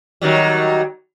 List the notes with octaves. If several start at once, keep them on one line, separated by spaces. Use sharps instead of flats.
D#3 F#3 G3